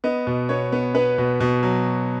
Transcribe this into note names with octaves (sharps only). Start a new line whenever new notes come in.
B3 D#5
B2
B3 C#5
B3
B3 B4
B2
B2
F#3